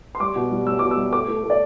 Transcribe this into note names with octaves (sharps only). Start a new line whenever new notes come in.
C6
G3 D6
B2
G3
G3 E6
B2 D6
E6
G3
A3 D6
A3
A3
D5